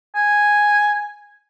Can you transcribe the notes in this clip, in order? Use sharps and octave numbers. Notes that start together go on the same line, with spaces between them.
G#5